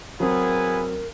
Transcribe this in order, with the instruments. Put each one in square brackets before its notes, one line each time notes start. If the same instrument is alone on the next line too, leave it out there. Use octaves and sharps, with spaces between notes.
[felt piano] F#3 C4 [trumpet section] B3 E4 G#4 [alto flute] A#4